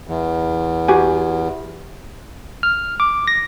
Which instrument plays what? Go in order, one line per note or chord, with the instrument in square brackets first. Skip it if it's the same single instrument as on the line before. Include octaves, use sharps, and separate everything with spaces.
[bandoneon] E2
[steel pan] F#4 G4 G#5
[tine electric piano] F6
D6
A#6